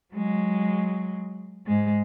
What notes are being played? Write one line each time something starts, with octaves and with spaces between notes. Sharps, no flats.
F#3 G#3
G#2 G#3